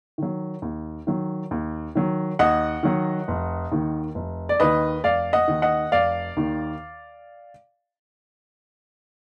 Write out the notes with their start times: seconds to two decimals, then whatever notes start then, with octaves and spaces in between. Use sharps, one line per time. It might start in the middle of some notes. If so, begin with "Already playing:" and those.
0.18 D#3 F#3
0.62 D#2
1.07 D#3 F#3
1.51 D#2
1.95 D#3 F#3
2.39 D#2 D#5 F#5
2.83 D#3 F#3
3.28 F1
3.71 D#2 D#3
4.15 F1
4.49 D5
4.60 D#2 D#3 B4 D#5
5.04 F1 D5 F5
5.33 D#5 F#5
5.48 D#2 D#3
5.62 D#5 F#5
5.92 F1 D5 F5
6.37 D#2 D#3